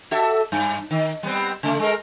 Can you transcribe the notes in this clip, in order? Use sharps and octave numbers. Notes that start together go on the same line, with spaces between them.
F#4 A4 E5
G2
D#3
G3 B3 C4
C#3 A3
G#3 A#4